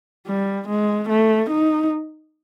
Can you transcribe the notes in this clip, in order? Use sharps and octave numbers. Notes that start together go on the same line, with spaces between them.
G3
G#3
A3
D#4